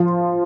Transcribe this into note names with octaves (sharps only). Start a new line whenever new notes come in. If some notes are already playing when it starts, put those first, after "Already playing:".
Already playing: F3 F4